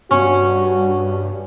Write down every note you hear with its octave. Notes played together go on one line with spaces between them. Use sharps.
G2 C#4 F#4 C#6